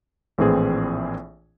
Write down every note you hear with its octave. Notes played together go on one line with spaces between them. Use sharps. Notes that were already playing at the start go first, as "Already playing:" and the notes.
A#1 A2 E3 C4 G#4